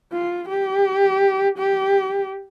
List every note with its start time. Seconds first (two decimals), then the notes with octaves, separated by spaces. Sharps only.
0.12 F4
0.49 G4
1.58 G4